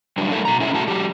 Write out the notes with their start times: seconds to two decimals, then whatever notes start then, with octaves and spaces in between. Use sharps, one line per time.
0.18 D3 F#3 G3 A3 D4
0.32 G3 A3 A#3 E4 A4 E5
0.45 B2 A#5
0.60 C#4 E4 G#4 A4 E5
0.74 A3 F#4 A5
0.87 F#3 G4